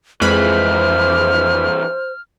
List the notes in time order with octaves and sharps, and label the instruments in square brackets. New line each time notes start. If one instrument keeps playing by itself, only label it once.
[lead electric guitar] C2 E3 [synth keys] F2 G#3 B5 [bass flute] C5 [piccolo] F6